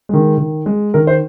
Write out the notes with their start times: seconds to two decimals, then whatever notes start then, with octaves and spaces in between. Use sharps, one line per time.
0.09 D#3 G#3
0.38 D#3
0.66 G#3
0.94 D#3 A#4
1.07 C5